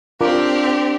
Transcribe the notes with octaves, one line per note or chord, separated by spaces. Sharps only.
C4 D4 F4 G4 A#4